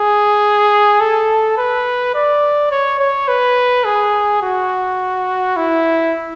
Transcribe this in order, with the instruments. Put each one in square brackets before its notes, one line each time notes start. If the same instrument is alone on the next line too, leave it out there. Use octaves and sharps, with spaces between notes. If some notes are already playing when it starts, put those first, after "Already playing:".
Already playing: [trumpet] G#4
A4
B4
D5
C#5
C#5
B4
G#4
F#4
E4